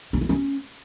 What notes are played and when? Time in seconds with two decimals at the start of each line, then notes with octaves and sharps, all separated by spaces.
0.13 D4
0.21 E4
0.29 C#4